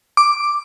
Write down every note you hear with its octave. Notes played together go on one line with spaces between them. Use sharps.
D6